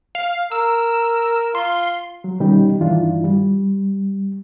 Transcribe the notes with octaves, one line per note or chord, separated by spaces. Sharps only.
F5
A#4 E6
F4 C6
F#3
B2 D#3 G3 C#4 D#4 G4
G2 D#3 E3 D4 E4 F4
G3